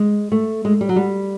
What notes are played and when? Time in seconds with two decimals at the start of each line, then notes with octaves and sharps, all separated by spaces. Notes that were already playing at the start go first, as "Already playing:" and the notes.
Already playing: G#3
0.32 A3
0.65 G#3
0.81 G3
0.89 F#3
0.96 G3